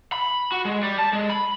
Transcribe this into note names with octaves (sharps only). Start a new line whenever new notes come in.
B5
F#4
G#3
G3
A5
G#3
B5